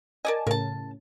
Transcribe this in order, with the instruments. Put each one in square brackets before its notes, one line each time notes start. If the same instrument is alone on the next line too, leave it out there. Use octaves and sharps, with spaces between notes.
[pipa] A#4 D5 D#5 [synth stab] G#5 A5
[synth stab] A2 C#3 [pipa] A#4 A5